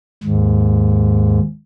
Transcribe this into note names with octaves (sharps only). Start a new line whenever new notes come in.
D#2 G#2